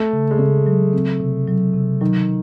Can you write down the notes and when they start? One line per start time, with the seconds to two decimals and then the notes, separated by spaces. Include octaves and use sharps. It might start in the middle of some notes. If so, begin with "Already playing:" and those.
Already playing: A3
0.13 C#3
0.31 G#3
0.39 C#3 A3
0.67 F#3
0.93 C4
1.20 C3
1.48 F#3
1.74 C3
2.01 D#3 F#3